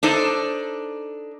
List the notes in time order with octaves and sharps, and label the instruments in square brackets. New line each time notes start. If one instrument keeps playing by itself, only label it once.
[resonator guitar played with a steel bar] D4 D#4 A4 C5